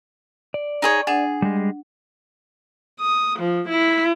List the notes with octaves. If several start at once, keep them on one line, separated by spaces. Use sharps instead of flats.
D5
D#4 G#4 C#5
D4 G#4 F#5 A6
G3 G#3
D#6
F3
E4